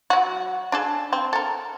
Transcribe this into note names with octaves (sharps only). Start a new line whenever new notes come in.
F#3 F#4
D4 G#4 A4
C4
A4 A#4